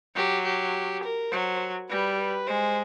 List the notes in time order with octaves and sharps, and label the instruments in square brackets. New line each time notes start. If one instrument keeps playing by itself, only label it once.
[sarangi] F#3 [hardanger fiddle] G4
[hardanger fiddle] G4
A#4
[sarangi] F#3 [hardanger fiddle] C5
[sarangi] G3 [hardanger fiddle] B4
[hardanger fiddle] B4
[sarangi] G#3 [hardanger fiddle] C5